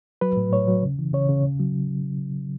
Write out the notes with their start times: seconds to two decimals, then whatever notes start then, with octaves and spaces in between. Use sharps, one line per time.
0.21 F#3 B4
0.37 A2
0.52 A2 C#5
0.68 F#3
0.83 C#3
0.99 E3
1.13 C#3 C#5
1.29 C#3
1.44 C#3
1.60 F#3